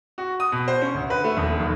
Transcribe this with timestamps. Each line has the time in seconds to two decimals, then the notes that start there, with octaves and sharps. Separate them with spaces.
0.18 F#4
0.40 D#6
0.52 B2
0.68 C5
0.82 C#4
0.94 D2
1.10 B4
1.24 A3
1.37 D#1
1.60 B1